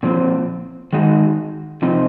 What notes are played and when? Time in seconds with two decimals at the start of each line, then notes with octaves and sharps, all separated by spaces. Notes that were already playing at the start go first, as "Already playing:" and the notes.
0.03 A#2 F3 C4
0.93 D#3 G#3 D#4 F#4
1.82 C3 F3 C4 D#4